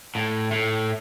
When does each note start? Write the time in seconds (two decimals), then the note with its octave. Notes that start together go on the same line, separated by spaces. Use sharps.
0.15 A2
0.52 A2